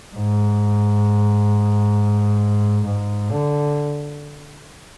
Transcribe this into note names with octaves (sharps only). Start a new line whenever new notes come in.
G#2
G#2
D3